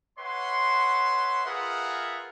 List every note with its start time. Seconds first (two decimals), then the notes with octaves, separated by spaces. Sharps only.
0.19 B4 C#5 E5 F#5 C6
1.45 F4 G#4 A#4 B4 E5 F#5